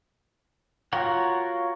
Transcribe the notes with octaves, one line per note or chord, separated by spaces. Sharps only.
F4 F#4 A#4 C#5 F#5